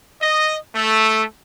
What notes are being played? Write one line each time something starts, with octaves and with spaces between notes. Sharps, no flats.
D#5
A3